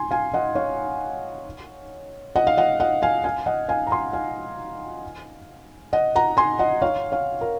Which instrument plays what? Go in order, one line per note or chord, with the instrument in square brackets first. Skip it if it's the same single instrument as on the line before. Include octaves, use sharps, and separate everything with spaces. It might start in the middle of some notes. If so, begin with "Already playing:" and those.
Already playing: [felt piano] G#5 C6
F5 G#5
D#5 F#5
C#5 F5
D#5 F#5
F5
D#5 F#5
D#5 F#5
F5 G#5
F5 G#5
D#5 F#5
F5 G#5
A#5
G#5 C6
F5 G#5
D#5 F#5
F#5 A#5
G#5 C6
D#5 F#5
C#5 F5
C#5 F5
A#4